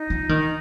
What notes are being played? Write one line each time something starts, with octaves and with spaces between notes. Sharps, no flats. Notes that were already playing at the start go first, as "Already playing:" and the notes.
Already playing: D#4
F3
D#3